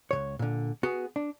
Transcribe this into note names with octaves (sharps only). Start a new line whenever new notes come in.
C#2 C3 C#5
A#2 D3
B3 F#4 G#4
D4